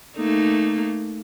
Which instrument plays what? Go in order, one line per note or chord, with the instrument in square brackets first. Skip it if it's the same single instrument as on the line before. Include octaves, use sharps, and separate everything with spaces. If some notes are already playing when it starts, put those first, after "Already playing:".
[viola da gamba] A3 A#3 D#4